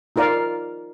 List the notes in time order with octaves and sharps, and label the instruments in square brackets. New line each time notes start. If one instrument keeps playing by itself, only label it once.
[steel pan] D#4 F4 A#4 D5 F5